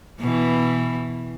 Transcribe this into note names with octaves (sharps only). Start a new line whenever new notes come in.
B2 E3